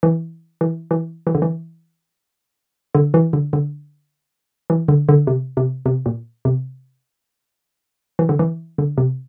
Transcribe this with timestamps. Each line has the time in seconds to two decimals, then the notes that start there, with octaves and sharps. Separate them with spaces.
0.03 E3
0.61 E3
0.91 E3
1.27 E3
1.35 D3
1.42 E3
2.95 D3
3.14 E3
3.33 D3
3.53 D3
4.70 E3
4.88 D3
5.09 D3
5.27 C3
5.57 C3
5.86 C3
6.06 A#2
6.45 C3
8.19 E3
8.29 D3
8.39 E3
8.78 D3
8.98 C3